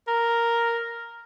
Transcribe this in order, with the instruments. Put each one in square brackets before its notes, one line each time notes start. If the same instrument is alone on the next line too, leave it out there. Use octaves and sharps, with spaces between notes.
[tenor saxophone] A#4